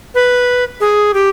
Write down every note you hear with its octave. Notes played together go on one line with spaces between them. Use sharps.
B4
G#4
G4